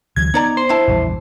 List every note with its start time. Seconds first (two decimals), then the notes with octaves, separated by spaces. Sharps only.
0.16 D2 E3 F#3 G#6
0.34 B3 D#4 D5 A#5
0.57 C5
0.69 D4 E4 A5
0.87 A#1 E2 G3